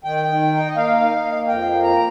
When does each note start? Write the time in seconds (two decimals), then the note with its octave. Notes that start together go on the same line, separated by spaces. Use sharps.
0.04 D#3 G5
0.28 D#3
0.52 D#4
0.69 D#5
0.76 A#3 F5
1.00 D#4
1.24 A#3
1.48 F2 G5
1.72 A#3
1.84 A#5